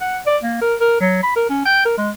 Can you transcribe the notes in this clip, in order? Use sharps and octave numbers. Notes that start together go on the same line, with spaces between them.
F#5
D5
A#3
A#4
A#4
F#3
B5
A#4
C#4
G5
A#4
G#3